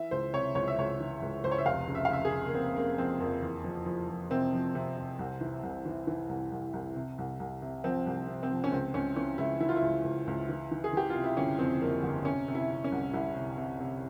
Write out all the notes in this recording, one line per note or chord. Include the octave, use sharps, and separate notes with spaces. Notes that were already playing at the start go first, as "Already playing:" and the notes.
Already playing: E3 E5
C#2 C5
C3 C#5
C#2 C#5
E5
C#2 C#5
E3
C#2
C#2 C5
C#5
E5
F1 F5
C#3
E5
F5
C#3 E5
G#4
C#3
A#3
F1 C4
C#3 A#3
F2 C4
F2 A#3
E2
F3
F3
F3
C3 C4
F3
C3
C3
C2
E3
C2
E3
E3
C2
C2
C2
C3
C2
C2
C3
F3 C4
C2
C3
C4
F3
C#4
C#2 C4
C#2 C#4
E3 C#4
C#2 E4
E3 E4
F4
E4
C#2
C#2
C#2
E3
E3
G#4
E3 G4
F4
C3
E4
G1 C#4
F2 C4
F2 A#3
G1
C3 C#4
C3
E4
C3
C#4
C2
C2 E4
C3
C3
C3